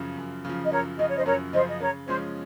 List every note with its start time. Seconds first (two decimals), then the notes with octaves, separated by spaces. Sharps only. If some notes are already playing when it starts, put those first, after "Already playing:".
Already playing: F#2 C#3 F3
0.18 F#2
0.45 C#3 F3
0.64 D#5
0.72 F#2 A#4 C#5
0.99 C#3 F3 D#5
1.09 C#5
1.16 C5 D#5
1.26 F#2 A#4 C#5
1.53 C#3 F3 C5 D#5
1.69 D#5
1.80 C#3 A#4 C#5
2.08 F3 G#3 C#4 C5